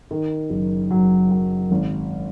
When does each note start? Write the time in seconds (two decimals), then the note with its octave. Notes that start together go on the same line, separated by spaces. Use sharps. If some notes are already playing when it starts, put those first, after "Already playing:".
0.11 D#3
0.50 F#1
0.91 F#3
1.30 F#3
1.71 G#1